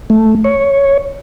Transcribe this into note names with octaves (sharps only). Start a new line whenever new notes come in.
A3
C#5